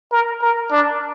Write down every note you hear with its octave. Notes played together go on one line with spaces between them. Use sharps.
A#4
A#4
D4